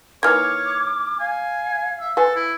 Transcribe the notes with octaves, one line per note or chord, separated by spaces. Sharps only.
D#3 E3 A#3 C#5 D6 F6 G#6
F5 G#5
E5
A4 B4 F5 G#5
E4